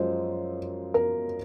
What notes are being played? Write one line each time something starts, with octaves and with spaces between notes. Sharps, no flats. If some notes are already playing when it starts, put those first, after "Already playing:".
Already playing: F#2 F3 G#3 C5
A#4